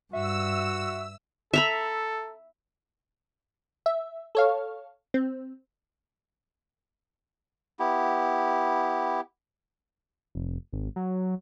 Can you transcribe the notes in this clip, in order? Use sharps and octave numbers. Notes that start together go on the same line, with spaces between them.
G2 F#4 E5 E6
A4 E5 A#5 B5
E5
A4 C#5 F5
C4
B3 E4 G4
F1
G#1
F#3